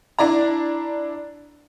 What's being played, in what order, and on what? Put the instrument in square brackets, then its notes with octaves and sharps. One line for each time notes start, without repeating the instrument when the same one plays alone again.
[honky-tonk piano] D4 E4 D5 A#5